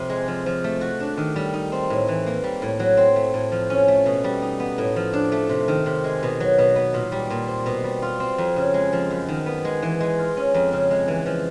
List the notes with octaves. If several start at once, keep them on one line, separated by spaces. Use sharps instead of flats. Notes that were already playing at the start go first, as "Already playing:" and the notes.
Already playing: F2 C3
G#3
F3
F3
A3
F#4
D4
D#3
G3
D#4
C4
A2
E3
A#3
G3
A2
F#3
C4
A3
A2
F3
C#4
A3
B2
G3
D#4
B3
A2
F3
D4
A3
C3
D#3
C3
G#3
B2
F#3
B2
B3
A#2
G3
A#2
C4
B2
G3
F4
C4
F2
C#3
G#3
F3
F#2
D#3
B3
G#3
E3
G#3
F4
C#4
F2
C#3
G#3
E3
F3